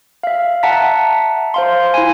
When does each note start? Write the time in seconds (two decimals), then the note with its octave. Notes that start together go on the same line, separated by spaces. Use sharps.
0.23 E5 F5
0.63 E5 F#5 A5 A#5 B6
1.54 C5 F5 C6
1.94 E4 G#5